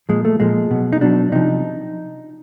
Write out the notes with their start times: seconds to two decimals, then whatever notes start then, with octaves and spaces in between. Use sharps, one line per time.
0.09 A#2 F3 G#3
0.25 A3
0.40 A#2 F3 G#3
0.71 B2 F#3
0.93 D#4
1.01 B2 F#3 D4
1.32 C3 F3 D#4